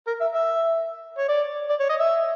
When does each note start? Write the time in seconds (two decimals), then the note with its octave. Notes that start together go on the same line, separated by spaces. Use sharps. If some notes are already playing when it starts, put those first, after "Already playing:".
0.07 A#4
0.20 E5
0.34 E5
1.17 C#5
1.28 D5
1.69 D5
1.80 C#5
1.89 D#5
1.99 E5